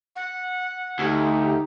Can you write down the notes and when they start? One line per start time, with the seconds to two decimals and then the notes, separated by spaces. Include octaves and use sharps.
0.16 F#5
0.99 D2 D#4 G4